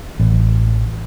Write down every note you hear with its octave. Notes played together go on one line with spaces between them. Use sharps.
A1